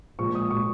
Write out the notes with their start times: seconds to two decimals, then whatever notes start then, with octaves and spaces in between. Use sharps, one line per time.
0.19 A#2 F3 G#3 C#6
0.35 D#6
0.51 A#2 F3 G#3 C#6